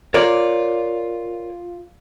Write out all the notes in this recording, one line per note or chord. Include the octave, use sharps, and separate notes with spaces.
F4 A#4 C#5 D5